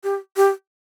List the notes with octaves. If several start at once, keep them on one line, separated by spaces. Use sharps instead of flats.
G4
G4